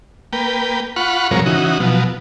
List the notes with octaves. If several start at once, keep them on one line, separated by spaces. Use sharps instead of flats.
A#3 B4 G5
F4 F#5 B5 C#6
G#2 C3 F3 F#3 A#4 C#5
C#3 E3 D#4 F#4
B2 F3 F#3